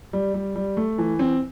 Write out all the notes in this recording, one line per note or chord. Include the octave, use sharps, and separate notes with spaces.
G3
G3
G3
A3
E3
C4